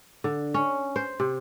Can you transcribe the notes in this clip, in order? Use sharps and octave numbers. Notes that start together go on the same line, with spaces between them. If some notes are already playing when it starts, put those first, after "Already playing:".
D3
C#4
C5
C3